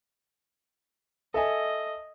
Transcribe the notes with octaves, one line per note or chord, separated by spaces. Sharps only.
A4 D#5 E5 G#5